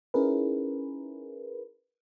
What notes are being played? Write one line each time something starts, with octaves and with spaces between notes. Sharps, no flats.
C#4 D#4 E4 G#4 A#4 B4